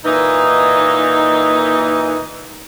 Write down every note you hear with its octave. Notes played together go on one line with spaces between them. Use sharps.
A#2 E3 A#3 D#4